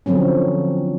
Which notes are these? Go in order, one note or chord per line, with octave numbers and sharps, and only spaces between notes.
D3 F3 F#3 C4 C#4